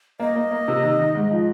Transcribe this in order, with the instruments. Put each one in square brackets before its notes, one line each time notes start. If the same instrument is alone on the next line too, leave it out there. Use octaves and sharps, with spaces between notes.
[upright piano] A#3 [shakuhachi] D#5
[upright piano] A#3
A#3
C3
D#3
D#3
G#2
F3